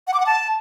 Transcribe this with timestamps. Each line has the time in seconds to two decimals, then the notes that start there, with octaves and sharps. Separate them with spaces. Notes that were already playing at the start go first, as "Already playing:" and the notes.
0.07 F#5
0.14 D6
0.20 F#5
0.26 A5